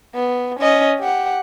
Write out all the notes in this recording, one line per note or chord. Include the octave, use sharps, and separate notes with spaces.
B3
C#4 D#5
G4 F#5